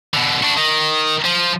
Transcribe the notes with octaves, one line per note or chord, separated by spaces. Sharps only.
B2 D3
D4 F#4
D#3
F3